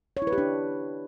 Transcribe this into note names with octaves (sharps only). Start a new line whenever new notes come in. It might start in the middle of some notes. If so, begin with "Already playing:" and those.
C#5
E4
B4
G4
D4